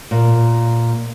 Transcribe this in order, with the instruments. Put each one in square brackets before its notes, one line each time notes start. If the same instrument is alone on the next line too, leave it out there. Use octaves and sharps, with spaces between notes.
[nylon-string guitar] A#2